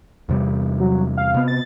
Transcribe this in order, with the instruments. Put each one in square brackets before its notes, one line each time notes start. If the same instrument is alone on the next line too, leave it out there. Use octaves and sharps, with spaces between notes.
[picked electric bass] E2 C3 G3
[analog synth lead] F#3
F5
[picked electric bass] C3 B3
[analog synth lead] A6